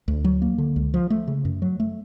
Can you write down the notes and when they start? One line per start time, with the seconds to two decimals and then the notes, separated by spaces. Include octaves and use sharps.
0.08 D2
0.24 F#3
0.42 A#3
0.58 D3
0.76 C#2
0.94 F3
1.10 A3
1.27 C#3
1.45 F#2
1.62 F#3
1.80 A3